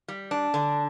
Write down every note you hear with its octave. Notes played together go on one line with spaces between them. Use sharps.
G3
D4
D3